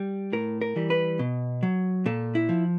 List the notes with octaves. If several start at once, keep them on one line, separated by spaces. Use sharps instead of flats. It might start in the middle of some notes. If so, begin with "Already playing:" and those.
Already playing: G3
A2 A#4
A#4
E3 G3
B4
B2
F#3
A#2 A4
E4
F3